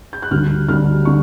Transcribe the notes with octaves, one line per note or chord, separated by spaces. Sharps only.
G6
F#6
D2 D3 G3 F6
D2 D3 G3 F6
D3 C#6